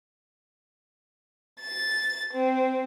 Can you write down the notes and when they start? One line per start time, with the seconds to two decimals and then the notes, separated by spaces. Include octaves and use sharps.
1.61 A6
2.34 C4